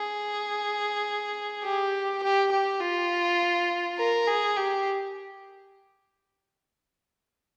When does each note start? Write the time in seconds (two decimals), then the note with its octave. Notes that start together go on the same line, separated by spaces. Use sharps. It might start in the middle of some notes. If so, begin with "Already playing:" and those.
Already playing: G#4
1.63 G4
2.23 G4
2.52 G4
2.81 F4
3.98 A#4
4.27 G#4
4.57 G4